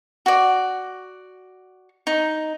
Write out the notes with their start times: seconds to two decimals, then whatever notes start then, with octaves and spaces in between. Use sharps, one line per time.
0.26 F#4 D5
2.07 D#4